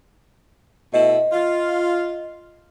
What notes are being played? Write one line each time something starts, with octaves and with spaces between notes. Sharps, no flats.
B2 A3 E4 D#5
F4